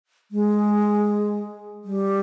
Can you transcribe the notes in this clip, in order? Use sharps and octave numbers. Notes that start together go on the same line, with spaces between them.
G#3
G3